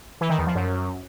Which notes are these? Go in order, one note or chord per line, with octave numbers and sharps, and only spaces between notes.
E3
D#3
E2
F3
F#2